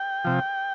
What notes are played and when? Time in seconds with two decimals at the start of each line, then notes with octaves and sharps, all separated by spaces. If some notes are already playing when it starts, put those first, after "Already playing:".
Already playing: G5
0.25 C3 F3